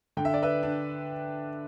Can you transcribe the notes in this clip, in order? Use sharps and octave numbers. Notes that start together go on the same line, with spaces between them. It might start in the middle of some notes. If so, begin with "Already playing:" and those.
D3 G5
E5
D5
B4 E5
D4